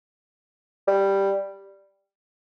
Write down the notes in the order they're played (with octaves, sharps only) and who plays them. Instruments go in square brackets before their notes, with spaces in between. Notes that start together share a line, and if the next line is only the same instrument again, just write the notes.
[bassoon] G3